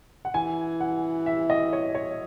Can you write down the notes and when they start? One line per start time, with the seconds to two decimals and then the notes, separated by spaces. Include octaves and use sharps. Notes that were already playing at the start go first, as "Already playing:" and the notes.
0.25 F#5
0.34 E3 G#5
0.80 F#5
1.26 E5
1.50 D#5
1.73 C#5
1.95 C#5